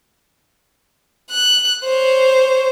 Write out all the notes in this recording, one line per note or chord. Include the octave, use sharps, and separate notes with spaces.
F#6
C5 C#5